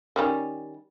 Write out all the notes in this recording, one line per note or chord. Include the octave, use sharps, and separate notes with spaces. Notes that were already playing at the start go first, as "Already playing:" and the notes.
D#3 G3 C#4